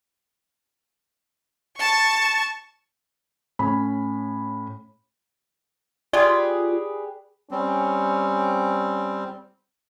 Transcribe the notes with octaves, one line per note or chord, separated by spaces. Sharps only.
A5 C#6
A2 C#4 B5
F4 G4 G#4 B4 D5
G3 C4 C#4